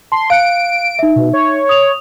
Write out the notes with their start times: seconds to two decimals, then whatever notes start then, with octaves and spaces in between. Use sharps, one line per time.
0.12 A5 C6
0.30 F5 F#6 C#7 D7
0.99 D#4 E5
1.16 B2
1.33 C#5
1.69 D#6 F7